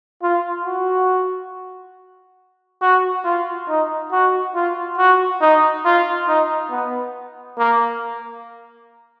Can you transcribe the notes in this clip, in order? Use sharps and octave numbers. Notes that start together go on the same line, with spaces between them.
F4
F#4
F#4
F4
D#4
F#4
F4
F#4
D#4
F4
D#4
B3
A#3